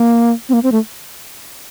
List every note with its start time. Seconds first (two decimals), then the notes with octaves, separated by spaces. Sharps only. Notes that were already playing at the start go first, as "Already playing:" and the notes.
Already playing: A#3
0.49 C4
0.53 A#3
0.63 C4
0.72 A3